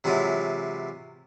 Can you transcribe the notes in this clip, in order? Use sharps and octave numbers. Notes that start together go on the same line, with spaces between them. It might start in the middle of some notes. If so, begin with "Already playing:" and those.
C3 E3 F#3 G#3 F4